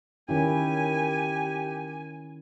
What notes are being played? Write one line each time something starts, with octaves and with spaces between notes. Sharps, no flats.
D#3 C#4 E4 G4 G#5